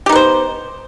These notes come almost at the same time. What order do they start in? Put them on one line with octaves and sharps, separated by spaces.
G4 D#4 B3 C5